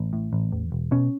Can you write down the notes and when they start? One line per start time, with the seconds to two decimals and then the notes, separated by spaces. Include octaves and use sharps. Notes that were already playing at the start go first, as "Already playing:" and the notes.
Already playing: A1
0.13 A2
0.33 A1
0.52 E2
0.72 E1
0.91 B2 C#4